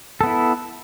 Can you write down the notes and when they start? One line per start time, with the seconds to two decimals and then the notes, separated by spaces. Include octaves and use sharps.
0.21 A4
0.23 B3
0.26 E4